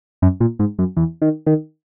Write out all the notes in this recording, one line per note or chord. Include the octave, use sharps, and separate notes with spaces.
F#2
A#2
G#2
F#2
E2
D#3
D#3